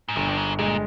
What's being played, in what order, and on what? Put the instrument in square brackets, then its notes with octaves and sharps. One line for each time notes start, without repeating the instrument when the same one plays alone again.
[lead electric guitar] G#2
[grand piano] G1 [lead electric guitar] A#2
[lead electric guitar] G2
G#2
[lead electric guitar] A#2 [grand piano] G#3